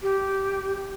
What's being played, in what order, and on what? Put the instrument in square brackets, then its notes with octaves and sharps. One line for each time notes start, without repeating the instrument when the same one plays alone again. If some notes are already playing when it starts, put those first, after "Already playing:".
[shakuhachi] G4